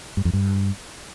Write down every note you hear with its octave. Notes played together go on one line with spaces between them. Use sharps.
G2
F2
G2